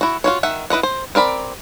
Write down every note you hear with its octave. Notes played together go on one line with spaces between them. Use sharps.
E4 F#4
F4 F#4 C#5
D#3 E5 F#5
E4 B4 D#5 F#5
C5
C4 A#4 D5 B5